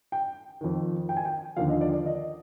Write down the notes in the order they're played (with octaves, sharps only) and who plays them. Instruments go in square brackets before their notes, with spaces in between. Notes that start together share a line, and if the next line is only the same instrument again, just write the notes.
[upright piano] G5
F2 D#3
G5
G#5
G5
D#2 D3 F3 F5
D#5
D5
D5
D#5